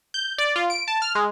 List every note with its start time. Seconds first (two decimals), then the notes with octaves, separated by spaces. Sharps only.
0.14 G6
0.38 D5
0.56 F4
0.70 D7
0.88 A5
1.02 F6
1.15 G#3